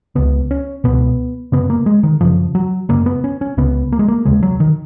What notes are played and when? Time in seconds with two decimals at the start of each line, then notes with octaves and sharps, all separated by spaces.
0.15 C#2 C#3 B3
0.51 C#4
0.84 C#2 B2 B3
1.52 F#2 C#3 B3
1.70 A#3
1.86 G#3
2.03 D#3
2.21 F#2 C#3 F3
2.55 F#3
2.89 F#2 C#3 A#3
3.06 B3
3.24 C#4
3.41 C#4
3.57 C#2 C#3 B3
3.92 A#3
3.99 G#3
4.08 A#3
4.25 D#2 C#3 G#3
4.43 F#3
4.60 D#3